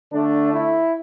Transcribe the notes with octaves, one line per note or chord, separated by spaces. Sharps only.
D3 A3 D4
E4